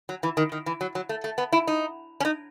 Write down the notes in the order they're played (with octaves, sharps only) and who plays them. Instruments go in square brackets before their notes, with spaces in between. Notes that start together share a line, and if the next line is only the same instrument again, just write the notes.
[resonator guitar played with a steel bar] F#3
E3
D#3
D#3
E3
F#3
F#3
A3
A3
B3
E4
D#4
C#4
D#4